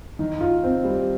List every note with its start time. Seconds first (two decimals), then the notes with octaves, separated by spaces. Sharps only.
0.19 D#3
0.41 F4
0.64 C4
0.85 G3